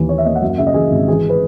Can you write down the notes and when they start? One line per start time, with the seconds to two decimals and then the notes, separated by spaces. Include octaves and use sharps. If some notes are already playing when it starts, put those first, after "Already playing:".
Already playing: D#2 E3
0.09 A#3 C#5
0.18 E5
0.25 A#3 D#5
0.35 F#5
0.41 F#2 E5
0.49 F#5
0.58 C#3 E5
0.67 D#5
0.74 E3 G#4
0.91 G#1
1.07 E3 G#4
1.29 B4